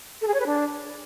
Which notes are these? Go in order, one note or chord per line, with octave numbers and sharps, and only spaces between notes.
A4
G#4
C#5
B4
D4